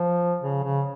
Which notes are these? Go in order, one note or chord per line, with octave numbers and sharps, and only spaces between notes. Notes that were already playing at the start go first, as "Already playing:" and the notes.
Already playing: F3
C#3
C#3